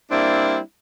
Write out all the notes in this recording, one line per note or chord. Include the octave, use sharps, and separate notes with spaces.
G3 A#3 C4 D4 E4